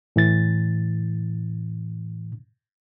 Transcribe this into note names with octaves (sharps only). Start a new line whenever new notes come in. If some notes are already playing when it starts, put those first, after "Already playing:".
A2 E3 A6